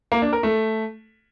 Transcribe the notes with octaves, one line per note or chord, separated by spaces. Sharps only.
A#3
D4
A#4
A3